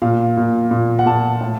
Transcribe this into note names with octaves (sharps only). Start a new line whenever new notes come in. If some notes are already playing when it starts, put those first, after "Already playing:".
A#2 F5
A#2
A#2
F#5
A#2 A5
A2